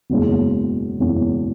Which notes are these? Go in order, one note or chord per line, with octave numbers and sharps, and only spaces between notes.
F#1 E2 B2 G#3 C#4
F#1 E2 B2 G#3 C#4